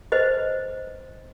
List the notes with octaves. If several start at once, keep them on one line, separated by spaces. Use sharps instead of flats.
B4 C5 D#5